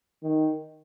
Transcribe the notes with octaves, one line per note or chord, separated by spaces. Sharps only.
D#3